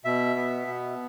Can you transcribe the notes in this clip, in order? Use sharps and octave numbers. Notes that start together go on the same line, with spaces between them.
B2 E5
B3
B2